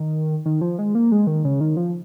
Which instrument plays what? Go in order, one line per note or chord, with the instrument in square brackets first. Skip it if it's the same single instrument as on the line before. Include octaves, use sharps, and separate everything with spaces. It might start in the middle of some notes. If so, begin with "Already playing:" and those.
Already playing: [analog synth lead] D#3
D#3
F3
G#3
A#3
G#3
D#3
C#3
D#3
F3